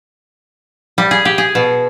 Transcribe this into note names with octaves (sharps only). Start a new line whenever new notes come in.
G3
G#4
G4
G#4
B2